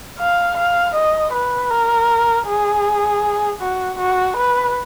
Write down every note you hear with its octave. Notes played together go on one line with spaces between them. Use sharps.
F5
F5
D#5
B4
A#4
G#4
F#4
F#4
B4